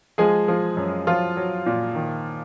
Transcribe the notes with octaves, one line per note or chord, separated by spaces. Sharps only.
F3 G#3 G#4
F3
F#2
F3 F#3 F4
F#3
A#2
D#3